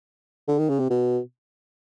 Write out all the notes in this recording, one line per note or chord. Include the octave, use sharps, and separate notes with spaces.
D3
D#3
C#3
C3
B2